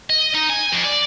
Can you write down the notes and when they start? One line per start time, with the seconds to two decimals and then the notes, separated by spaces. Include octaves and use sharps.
0.10 D#5
0.35 D#4
0.50 G#5
0.73 F2
0.85 D5